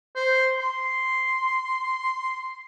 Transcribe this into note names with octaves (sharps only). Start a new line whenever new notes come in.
C5
C6